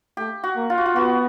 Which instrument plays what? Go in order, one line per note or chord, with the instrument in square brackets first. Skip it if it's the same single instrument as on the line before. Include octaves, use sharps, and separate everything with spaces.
[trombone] A3 [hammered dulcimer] G4
[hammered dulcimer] F#4
[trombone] A#3
[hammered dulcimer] F4
F#4
F4
[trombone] B3 [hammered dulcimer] F#4